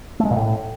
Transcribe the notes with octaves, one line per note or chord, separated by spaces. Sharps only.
A3
G#3
A#2
A2